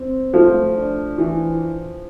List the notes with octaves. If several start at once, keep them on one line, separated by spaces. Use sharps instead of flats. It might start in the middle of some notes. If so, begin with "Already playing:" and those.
Already playing: C4
F3 A3
D4
E3